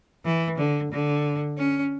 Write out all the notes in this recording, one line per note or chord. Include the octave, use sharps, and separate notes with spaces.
E3
D3
D3
C#4